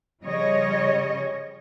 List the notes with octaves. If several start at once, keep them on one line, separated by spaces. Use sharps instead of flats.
C#3 F3 G3 C#5 D#5